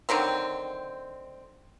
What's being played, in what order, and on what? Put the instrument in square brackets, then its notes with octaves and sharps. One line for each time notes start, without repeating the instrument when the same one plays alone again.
[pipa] D3 D#3 F#3 C4